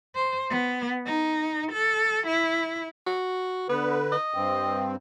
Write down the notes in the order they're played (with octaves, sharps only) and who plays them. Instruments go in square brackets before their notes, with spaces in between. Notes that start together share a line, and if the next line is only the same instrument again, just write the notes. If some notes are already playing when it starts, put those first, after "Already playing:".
[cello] C5
B3
D#4
A4
E4
[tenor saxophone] F#4
[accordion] D3 B4 [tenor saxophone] B3
[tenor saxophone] D#5
[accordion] G2 C4